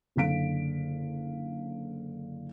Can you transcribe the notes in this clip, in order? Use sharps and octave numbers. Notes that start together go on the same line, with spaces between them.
F#1 D3 F5 B6 D7